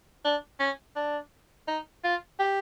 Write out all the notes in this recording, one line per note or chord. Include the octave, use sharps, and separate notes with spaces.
D4
C#4
D4
D#4
F4
G4